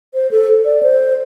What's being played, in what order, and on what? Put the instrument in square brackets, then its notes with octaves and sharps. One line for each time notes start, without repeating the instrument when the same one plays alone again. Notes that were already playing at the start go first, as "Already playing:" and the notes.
[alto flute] C5
A4
D5
C5